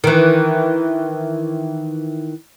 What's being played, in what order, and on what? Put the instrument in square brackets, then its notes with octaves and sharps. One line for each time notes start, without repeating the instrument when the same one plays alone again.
[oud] D#3 E3